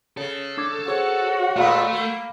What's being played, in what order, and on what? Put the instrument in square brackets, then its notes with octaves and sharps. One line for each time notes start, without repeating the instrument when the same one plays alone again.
[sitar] C#3 [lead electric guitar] A4
[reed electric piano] D4 D6 G#6
[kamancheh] F#4 [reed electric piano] G#4 C5 [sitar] C#5
[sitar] A#2 G#3 F4 [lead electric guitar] A3 [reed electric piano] F5 A#5 B5
[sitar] A#3